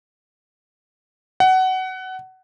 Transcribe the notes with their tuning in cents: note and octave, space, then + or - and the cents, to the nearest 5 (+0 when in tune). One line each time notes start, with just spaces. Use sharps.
F#5 +20